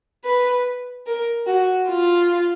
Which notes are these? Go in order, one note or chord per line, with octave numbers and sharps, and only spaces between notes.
B4
A#4
F#4
F4